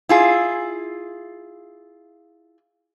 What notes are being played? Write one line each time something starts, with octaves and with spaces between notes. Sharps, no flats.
E4 F4 G#4